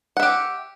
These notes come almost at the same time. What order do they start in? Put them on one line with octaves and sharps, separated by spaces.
F#5 E5 G4